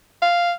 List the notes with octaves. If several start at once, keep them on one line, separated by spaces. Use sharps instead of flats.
F5